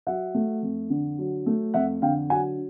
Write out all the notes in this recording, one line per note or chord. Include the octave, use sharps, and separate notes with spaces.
F#3 E5 F#5
A3
F2
D3
F#3
A3
F2 E5 F#5
D3 F5 G5
F#3 F#5 G#5